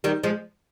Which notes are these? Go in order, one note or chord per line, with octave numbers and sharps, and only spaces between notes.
D#3 G3
F3 G#3